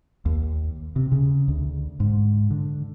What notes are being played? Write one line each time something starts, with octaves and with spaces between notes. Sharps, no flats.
D#2
C3
C#3
D2
G#2
D3